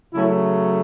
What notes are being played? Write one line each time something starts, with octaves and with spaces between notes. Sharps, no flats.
C#3 F#3 A3 C#4 E4